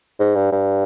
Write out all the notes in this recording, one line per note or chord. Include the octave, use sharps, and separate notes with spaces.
G#2
G2
G2